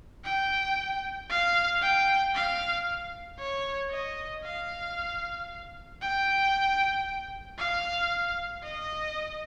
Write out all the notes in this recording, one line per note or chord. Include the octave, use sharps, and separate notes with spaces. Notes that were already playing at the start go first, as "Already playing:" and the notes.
G5
F5
G5
F5
C#5
D#5
F5
G5
F5
D#5